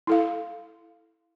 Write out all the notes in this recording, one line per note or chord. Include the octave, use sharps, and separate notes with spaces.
E4 A4 F5